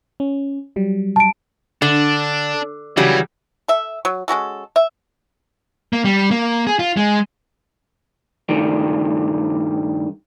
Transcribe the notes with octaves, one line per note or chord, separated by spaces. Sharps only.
C#4
F#3 G3
A5 D7
D3 D4
C#3 E3 F#3 G3
A4 E5
F#3
G#3 C#4 F#4 A4
E5
A#3
G3
A#3
G#4
F4
G#3
G2 D#3 G3 A3